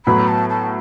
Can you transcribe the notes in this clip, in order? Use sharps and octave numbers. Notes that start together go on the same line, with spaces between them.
A2 F#3 B3 B5
A5
A5